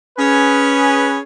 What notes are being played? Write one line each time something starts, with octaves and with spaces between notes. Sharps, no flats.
C#4 G#4 B4